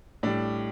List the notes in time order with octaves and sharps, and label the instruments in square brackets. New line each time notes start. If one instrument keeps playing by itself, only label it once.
[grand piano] A2 G3 D4 D5